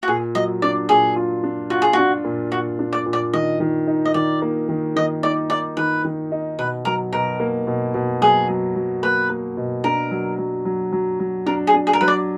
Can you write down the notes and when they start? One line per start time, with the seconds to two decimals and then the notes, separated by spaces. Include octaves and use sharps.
0.03 F#4
0.08 A#2 G#4
0.35 F#3 D#5
0.62 D4 D5
0.89 A#2 G#4
1.16 F4
1.43 D4
1.70 F4 F#4
1.82 G#4
1.93 D4 F#4
2.24 A#2
2.52 A#2 F#4
2.79 D4
2.93 D5
3.06 A#2
3.13 D5
3.33 D#3 D#5
3.60 D#3
3.87 D#4
4.05 D#5
4.14 D#3 D5
4.42 A#3
4.69 D#3
4.96 D#3 D#5
5.23 D#4 D5
5.50 D#4 D5
5.77 D#3 B4
6.05 D#3
6.32 D#4
6.58 B2 B4
6.85 F#3 A#4
7.13 B2 A#4
7.40 A#3
7.67 B2
7.94 B2
8.21 F#3 G#4
8.48 F#3
8.76 F#3
9.03 A#3 B4
9.30 A#3
9.57 B2
9.84 D4 A#4
10.11 F#3
10.38 F#3
10.65 F#3
10.92 F#3
11.20 F#3
11.46 D4 A#4
11.67 G#4
11.74 D4
11.87 G#4
11.93 A#4
12.01 F#3 B4
12.08 D5